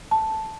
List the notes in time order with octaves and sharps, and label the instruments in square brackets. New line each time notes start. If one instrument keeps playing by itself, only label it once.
[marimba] A5